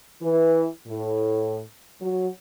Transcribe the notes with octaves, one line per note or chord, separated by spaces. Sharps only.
E3
A2
F#3